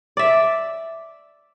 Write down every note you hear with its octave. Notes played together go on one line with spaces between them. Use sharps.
D5 E5